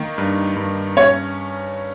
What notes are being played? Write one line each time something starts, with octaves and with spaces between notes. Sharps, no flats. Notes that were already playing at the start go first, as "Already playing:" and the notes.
Already playing: D#3 A#3
G2
G2
C#4 C#5